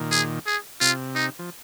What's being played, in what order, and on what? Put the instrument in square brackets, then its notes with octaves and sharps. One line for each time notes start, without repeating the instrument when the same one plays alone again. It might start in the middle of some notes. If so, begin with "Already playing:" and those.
Already playing: [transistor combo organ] A#2 D#3
[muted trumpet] G#4
G#4
[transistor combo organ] C3 [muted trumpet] F4
[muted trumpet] D#4
[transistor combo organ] F3